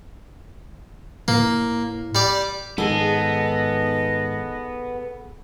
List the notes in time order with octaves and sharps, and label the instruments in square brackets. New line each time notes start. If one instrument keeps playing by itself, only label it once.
[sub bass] A2 [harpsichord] A#3
[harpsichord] G3 D5
[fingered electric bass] G#2 D#3 [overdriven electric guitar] B3 [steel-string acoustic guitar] G#4 A4 [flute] D#5